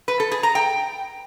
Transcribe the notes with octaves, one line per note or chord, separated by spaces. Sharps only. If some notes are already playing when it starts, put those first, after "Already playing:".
B4
A4
G#4
A#5
G5